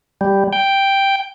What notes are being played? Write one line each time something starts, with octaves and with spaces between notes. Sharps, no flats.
G3
G5